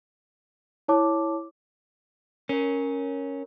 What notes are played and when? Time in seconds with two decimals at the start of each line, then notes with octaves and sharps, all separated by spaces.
0.88 E4 C#5 A5 D6
2.49 C#4 A#4 C#5